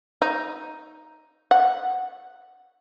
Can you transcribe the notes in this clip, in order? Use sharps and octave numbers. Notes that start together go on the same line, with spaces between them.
D#4
F#5